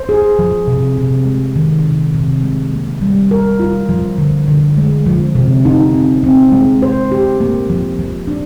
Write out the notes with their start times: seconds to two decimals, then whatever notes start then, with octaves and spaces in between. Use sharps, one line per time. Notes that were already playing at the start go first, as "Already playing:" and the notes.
Already playing: C5
0.09 G#4
0.39 F3
0.67 C3
0.98 C3
1.26 G#3
1.56 D#3
1.85 C3
2.15 C3
2.44 G#3
2.73 A#3
3.02 G3
3.31 A#4
3.60 F4
3.89 F3
4.18 D3
4.48 D3
4.78 G#3
5.06 F3
5.35 C3
5.65 D#4
5.94 C4
6.24 C4
6.52 G#3
6.82 C5
7.12 G4
7.41 A#3
7.70 F3
7.99 F3
8.27 D4